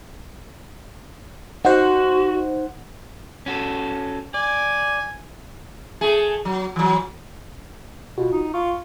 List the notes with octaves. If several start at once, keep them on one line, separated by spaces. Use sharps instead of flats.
D#4 F#4 C5 F#5
C#4 F#4 A4
D5 G#5
A3 G#4
F#3
E3 F#3
B2 F4 F#4
D#4
F4 C#6